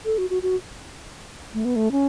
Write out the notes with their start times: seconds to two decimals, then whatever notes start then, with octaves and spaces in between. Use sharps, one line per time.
0.05 A4
0.18 F#4
0.30 F#4
0.43 F#4
1.54 A3
1.65 B3
1.76 A3
1.92 C#4